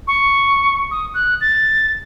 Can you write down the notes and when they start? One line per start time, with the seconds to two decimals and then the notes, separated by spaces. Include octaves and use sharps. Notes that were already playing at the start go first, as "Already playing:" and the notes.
0.08 C#6
0.91 D#6
1.14 F#6
1.41 A6